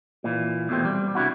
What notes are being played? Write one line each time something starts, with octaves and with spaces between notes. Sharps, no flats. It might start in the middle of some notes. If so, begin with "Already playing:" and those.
A#2 E3
E2 B2 A3 C4
G3
C3 D4 E4 F#4